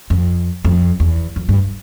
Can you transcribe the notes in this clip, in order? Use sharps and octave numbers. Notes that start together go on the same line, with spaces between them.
F2
F2
E2
F2
G2